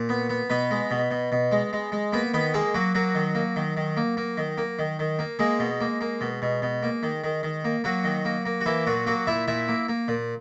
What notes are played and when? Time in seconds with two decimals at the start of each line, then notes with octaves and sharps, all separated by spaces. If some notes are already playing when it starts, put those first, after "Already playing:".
Already playing: A#2
0.09 B3
0.29 B3
0.50 B2 B3 B4
0.71 G#3
0.91 B2
1.11 B2
1.32 B2
1.52 G#3
1.73 G#3
1.92 G#3
2.13 A#3 B3 B4
2.34 D#3 B3 B4
2.54 G#3 A#3 G#4
2.74 F#3 A#3 F#4
2.95 F#3 A#3 F#4
3.15 D#3
3.35 A#3
3.56 D#3
3.77 D#3
3.97 A#3
4.17 A#3
4.37 D#3
4.58 A#3
4.79 D#3
4.99 D#3
5.19 A#3
5.39 G#3 A#3 G#4
5.59 B2
5.81 A#3
6.01 A#3
6.21 B2
6.42 B2
6.62 B2
6.83 A#3
7.03 D#3
7.24 D#3
7.43 D#3
7.64 A#3
7.84 F#3 A#3 F#4
8.04 D#3
8.25 A#3
8.46 A#3
8.61 F#4
8.66 E3 A#3 E4
8.87 A#2 F#3 F#4
9.06 F#3 A#3 F#4
9.27 A#2 E4 E5
9.48 A#2 E4 E5
9.68 A#3
9.88 A#3
10.08 A#2